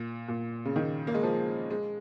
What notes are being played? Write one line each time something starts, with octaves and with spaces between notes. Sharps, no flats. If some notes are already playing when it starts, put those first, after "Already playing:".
Already playing: A#2
A#2
C#3
D#3
A#3
G#3
F3
G#3